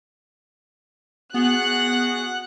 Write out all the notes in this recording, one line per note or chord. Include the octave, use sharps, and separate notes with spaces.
B3 F#4 G#4 F#5 F#6